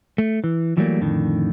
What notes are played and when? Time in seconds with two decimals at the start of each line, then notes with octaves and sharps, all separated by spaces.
0.18 A3
0.44 E3
0.77 E3 F#3 G3 A3 A#3
1.01 F2 A2 D3 D#3